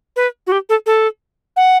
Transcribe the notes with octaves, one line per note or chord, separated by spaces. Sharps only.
B4
F#4
G4
A4
A4
F#5